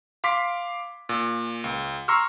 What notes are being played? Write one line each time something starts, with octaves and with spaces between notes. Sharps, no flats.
F5 C6 D6 B6
A#2
C#2
A#5 C6 C#6 E6 F6